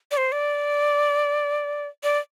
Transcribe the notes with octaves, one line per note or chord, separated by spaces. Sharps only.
D5
C5
D5
D5